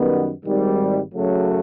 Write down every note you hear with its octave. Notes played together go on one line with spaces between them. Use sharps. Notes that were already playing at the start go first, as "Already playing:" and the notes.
Already playing: F#2 D#3 G3 B3
G#1 G#2 D#3 G3
F#2 C#3 F#3 A3